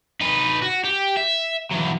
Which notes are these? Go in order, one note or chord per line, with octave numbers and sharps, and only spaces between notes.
D#4 B4
F#4
G4
E5
E3 F#3